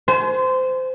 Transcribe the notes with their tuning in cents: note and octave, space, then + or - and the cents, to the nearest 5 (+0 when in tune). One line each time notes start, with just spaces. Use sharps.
C5 -20 G#5 +35